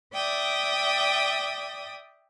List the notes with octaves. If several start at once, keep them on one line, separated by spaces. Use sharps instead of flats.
D5 E5 G5 D#6